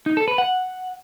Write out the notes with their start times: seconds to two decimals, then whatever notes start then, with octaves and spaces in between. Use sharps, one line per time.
0.06 D#4
0.17 A4
0.28 B4
0.38 F#5